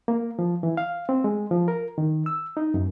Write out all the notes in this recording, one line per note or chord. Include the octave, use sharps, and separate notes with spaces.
A#3
F3
E3
F5
C4
G#3
F3
A#4
D#3
E6
D#4
F#2